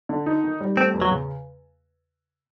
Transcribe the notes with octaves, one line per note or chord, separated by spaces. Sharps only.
D3
D#4
D#3
G3
A3 C4
E2
F#3
C#3